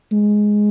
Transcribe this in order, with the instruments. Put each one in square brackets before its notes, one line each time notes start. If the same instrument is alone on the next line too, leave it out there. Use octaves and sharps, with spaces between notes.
[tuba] G#3